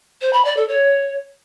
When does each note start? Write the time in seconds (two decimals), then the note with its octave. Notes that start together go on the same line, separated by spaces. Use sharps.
0.21 C5
0.32 B5
0.44 D5
0.56 A4
0.68 C#5